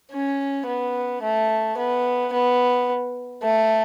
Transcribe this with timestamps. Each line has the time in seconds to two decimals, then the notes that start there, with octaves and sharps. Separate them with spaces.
0.12 C#4
0.67 B3
1.23 A3
1.78 B3
2.33 B3
3.43 A3